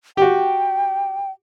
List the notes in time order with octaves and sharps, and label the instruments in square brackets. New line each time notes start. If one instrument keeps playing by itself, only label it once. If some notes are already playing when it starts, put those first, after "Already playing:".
[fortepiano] F#4 G4 [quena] G5